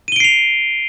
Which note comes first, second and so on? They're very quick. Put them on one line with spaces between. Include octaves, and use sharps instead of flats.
D#7 G7 D7 C7 F7